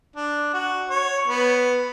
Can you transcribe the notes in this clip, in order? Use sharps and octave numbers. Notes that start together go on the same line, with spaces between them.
D4
F#4
C#5
B3